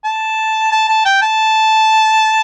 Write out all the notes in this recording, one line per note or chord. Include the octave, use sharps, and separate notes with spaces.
A5
A5
A5
G5
A5